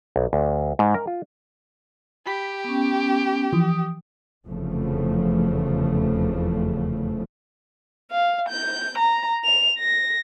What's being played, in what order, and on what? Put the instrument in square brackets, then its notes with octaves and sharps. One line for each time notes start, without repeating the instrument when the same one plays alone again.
[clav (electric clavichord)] B1
D2
G#2
A#4
F4
[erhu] G4 [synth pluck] B5 B6
[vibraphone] B3 C#4
[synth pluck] E3 F3 [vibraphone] D#6
[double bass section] F1 E2 C#3 F3 A3
[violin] F5
G6
A#5
F7
A#6